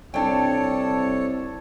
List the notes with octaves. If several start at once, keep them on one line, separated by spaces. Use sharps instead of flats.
C2 D4 A4 C#5 G5